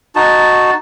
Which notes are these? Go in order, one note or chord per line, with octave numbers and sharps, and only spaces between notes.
D#4 F#4 A5